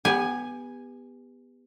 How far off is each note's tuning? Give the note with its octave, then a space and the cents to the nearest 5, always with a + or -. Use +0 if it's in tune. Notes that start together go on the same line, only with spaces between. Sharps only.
B3 +0 G4 +30 G#5 +0